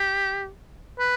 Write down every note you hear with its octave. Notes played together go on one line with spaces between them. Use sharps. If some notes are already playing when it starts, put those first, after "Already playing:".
Already playing: G4
B4